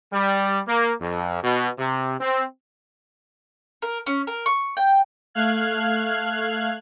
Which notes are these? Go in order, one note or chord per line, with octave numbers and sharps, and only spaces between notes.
G3
A#3
F2
B2
C3
C4
A#4
C#4
A#4
C#6
G5
A3 F5 F6 F#6 G#6